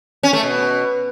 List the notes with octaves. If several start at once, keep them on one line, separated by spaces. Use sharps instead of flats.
C#4
A3
B2